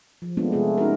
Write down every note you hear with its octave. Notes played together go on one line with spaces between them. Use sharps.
F3
G#3 A3 B3 C4 D4 F4
C3 G#3 A3 F4 G#4
C#4 D#4 F#4 A#4